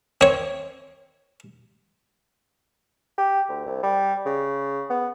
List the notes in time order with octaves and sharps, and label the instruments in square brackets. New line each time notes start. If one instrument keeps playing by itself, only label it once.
[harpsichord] C4 C#5
[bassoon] G4
D2
C2
G3
C#3
B3